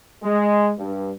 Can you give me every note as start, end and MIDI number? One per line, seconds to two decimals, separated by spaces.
0.24 0.71 56
0.79 1.11 43